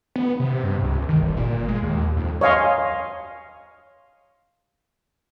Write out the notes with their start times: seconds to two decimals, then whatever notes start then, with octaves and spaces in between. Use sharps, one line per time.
0.16 B3
0.40 C3
0.63 G2
0.82 C#2
1.09 D#3
1.22 G1
1.37 A#2
1.68 G#3
1.83 D#2
2.17 F2
2.41 C#5 D#5 F5 G#5 C6